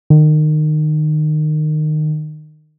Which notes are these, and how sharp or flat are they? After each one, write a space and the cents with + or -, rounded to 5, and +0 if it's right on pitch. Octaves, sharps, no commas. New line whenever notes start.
D#3 -25